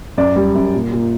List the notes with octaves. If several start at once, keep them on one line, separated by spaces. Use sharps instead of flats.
F#2 D5
G3
F#2
A#2
A#2